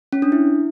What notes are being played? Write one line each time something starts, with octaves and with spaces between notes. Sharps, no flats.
C#4
D4
E4